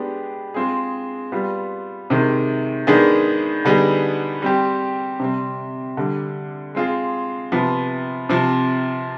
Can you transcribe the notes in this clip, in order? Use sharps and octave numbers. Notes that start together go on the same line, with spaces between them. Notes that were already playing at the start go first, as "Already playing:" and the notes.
Already playing: G#3 B3 D4 G4
G#3 C4 F4 G#4
G3 B3 F4
C3 D#3 G#3
D#3 G#3 B3 D4 G#4
D3 G3 B3 D#4 G#4
G3 C4 G4
C3 G3 C4
D3 G3 D4
G#3 C4 F4 G#4
C3 F3 B3
C3 F3 C4